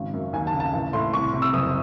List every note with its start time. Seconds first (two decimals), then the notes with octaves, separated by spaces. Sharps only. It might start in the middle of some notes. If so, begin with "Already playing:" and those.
Already playing: G#1 C#3
0.14 F#2
0.33 D#2 G#5
0.47 A5
0.53 C#3
0.60 A5
0.73 A1
0.93 A2 C6
1.13 C2 C#6
1.33 C3
1.42 E6
1.53 F#1 D#6